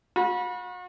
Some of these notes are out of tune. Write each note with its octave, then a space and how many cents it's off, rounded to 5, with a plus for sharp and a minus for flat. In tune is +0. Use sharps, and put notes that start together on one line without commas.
F#4 -40 B5 -30